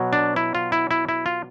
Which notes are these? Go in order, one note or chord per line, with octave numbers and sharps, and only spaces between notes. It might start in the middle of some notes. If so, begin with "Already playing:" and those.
Already playing: B2 F#3
D4
E4
F4
E4
E4
E4
F4